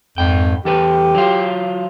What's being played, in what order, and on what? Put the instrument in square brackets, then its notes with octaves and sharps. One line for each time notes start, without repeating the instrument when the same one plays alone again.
[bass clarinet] F2 [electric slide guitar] G#2 G5
[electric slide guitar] E2 A4 B4 [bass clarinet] G4
[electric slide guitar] F#3 F4